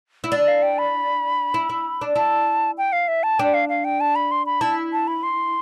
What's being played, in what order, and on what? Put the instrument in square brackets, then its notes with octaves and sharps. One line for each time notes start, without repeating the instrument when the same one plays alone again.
[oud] E4
[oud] D4 [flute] D5
[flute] F5
G5
B5
[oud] E4
E4
D4
[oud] E4 [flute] A5
[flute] G5
F5
E5
A5
[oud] D4 [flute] G5
[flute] F5
F5
G5
A5
B5
C6
B5
[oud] E4 [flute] A5
[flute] A5
B5
C6